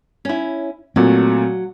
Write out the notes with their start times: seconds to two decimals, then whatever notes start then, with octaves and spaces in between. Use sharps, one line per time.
0.25 C#4 E4
0.96 A#2 F#3 A3 C4